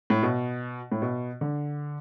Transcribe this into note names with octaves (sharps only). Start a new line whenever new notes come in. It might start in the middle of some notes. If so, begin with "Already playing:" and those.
A2
B2
A2
B2
D3